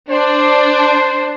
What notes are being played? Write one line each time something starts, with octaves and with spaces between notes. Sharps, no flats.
D4 C5